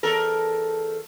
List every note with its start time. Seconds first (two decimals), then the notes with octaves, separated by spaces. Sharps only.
0.03 E2 A4 A#4